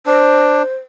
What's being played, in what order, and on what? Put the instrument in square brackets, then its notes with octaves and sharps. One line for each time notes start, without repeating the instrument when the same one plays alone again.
[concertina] D4 [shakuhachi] C5